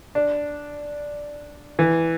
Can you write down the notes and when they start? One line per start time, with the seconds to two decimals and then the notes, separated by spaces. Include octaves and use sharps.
0.15 D4
1.79 E3